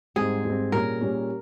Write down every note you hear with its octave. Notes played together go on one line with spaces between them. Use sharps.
G#2 G3 C4 G#4
G#2 G3 C4
A#2 G3 C#4 A#4
A#2 G3 C#4